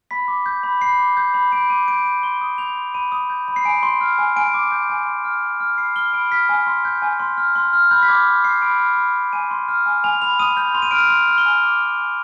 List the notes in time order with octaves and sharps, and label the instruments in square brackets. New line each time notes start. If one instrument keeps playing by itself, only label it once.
[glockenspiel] B5 B6
D6
G6
B5
B5 C7
D6
G6
B5
B5 D7
D6 D#7
G6 D7
B5 D#7
C6 G7
D#6
G6 F7
C6
B5 D#7
D#6
G6
B5
C7
G#5 D7
C6
F6
G#5
G#5 D7
D6
G6
G#5
C6
F6
C6
F6
B5 C7
F6 G7
B5 D7
F6 B6
G#5
C6
G6
G#5
C6
F6
C6
F6
B5 G6
B6
D6 G#6
G6 B6
B5 C7
B5 D7
F6
B5
F6
G#5 D#7
C6
F6
G#5
G#5 F7
B5 F7
D#6 D#7
G6 F7
C6 F7
D#7
F6 D7
D#7
C6 F7
F6
G7
G#5 F7
D6
F6
G#5